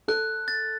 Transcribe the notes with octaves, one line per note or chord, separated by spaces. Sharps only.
A4 F#6
A6